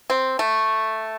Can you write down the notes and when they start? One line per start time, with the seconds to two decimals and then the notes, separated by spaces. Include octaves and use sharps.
0.10 C4
0.39 A3